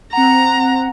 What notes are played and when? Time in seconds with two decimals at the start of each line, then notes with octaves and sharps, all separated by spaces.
0.13 C4 F#5 A#5